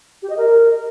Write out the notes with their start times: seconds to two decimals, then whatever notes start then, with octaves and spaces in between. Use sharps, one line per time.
0.22 G4
0.30 D#5
0.37 A#4